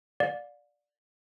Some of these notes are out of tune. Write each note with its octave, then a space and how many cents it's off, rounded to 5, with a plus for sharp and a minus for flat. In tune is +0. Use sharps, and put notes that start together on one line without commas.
D5 +0 F5 +35